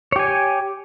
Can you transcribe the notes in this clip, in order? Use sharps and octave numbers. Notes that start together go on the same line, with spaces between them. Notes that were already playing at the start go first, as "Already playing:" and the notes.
G4 C#5 G#5